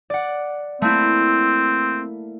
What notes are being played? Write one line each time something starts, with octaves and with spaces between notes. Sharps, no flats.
D5 F#5
A3 A#3 C4 E4